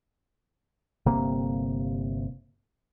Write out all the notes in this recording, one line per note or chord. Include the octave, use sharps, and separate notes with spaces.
G1 C3 A#3